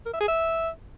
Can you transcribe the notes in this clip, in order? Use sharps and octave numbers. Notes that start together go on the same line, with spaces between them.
A#4
E5
G#4
E5